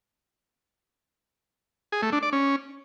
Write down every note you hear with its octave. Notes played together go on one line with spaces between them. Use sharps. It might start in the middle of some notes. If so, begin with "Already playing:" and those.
G#4
A3
D4
D5
C#4